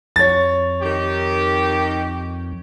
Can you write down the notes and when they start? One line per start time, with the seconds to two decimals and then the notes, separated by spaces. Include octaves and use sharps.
0.16 F2 C#5 A6
0.82 D#3 G4